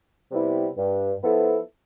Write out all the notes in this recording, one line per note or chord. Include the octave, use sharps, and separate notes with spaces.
C3 G3 B3 E4
G2
F3 B3 E4 A4